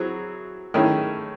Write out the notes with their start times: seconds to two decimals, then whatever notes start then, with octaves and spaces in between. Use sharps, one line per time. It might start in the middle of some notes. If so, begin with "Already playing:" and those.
Already playing: F#3 C4 E4 G#4
0.74 D#3 A3 C#4 E4 G#4